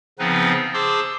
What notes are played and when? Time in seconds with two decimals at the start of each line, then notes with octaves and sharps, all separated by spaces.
0.19 C#3 F3 B3 C4 D#4 B4
0.74 G#4 C5 A5 C6 D6 E6